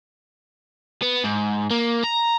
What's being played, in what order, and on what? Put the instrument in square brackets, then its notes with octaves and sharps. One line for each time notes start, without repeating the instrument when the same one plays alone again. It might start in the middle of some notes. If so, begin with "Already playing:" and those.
[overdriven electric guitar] B3
G#2
A#3
A#5